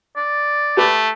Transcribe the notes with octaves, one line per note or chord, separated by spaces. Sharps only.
D5
A3 G4 B4